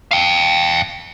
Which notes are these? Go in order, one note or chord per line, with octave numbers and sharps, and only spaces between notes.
F5 G5